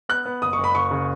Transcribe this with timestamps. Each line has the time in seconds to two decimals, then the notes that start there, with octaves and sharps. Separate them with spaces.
0.09 B3 F#6
0.26 B3
0.42 F#1 D#6
0.53 C#6
0.58 F#1
0.64 B5
0.75 F#1 C#6
0.91 C#3